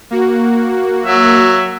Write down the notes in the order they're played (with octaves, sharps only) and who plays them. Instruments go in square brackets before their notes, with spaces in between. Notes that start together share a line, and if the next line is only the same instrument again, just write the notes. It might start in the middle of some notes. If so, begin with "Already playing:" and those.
[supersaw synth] A#3 F#4
[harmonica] F#3 E5